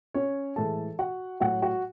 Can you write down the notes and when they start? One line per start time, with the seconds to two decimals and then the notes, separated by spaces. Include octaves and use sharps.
0.14 C#4 C#5
0.56 A2 E3 G#3 A4 A5
0.99 F#4 F#5
1.40 A2 F#3 F#4 F#5
1.62 F#4 F#5